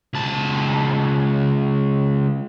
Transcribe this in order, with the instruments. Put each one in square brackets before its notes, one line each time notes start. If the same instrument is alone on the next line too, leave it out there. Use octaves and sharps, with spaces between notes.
[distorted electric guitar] C#2 A5